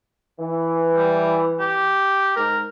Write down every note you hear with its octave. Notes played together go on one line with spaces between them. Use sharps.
E3
G3
G4
G#2 A#4